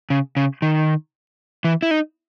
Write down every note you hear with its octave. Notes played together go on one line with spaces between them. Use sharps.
C#3
C#3
D#3
E3
E4
D#4